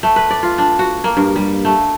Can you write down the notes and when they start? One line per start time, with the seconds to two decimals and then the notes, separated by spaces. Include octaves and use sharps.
0.03 A3
0.16 B4
0.30 D5
0.43 F4
0.58 D4
0.79 F#4
1.04 A#3
1.17 G2
1.36 G3
1.65 A3